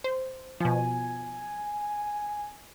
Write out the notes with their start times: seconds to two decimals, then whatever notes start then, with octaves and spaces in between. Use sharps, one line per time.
0.04 C5
0.60 B2 F3 G#5